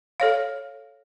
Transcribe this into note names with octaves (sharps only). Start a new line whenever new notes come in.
A4 C#5 F5